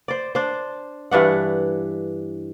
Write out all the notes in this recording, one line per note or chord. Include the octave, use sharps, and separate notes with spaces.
C5 D5
D4 C5
G2 E3 D4 F#5